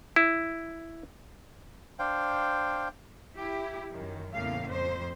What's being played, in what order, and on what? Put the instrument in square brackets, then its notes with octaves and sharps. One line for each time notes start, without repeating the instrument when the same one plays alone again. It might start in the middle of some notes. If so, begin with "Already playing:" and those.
[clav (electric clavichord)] E4
[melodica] D4 C5 F5 G5
[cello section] E4 G4
F#2 D#3
E2 A2 C#3 A#3 F5
F2 C5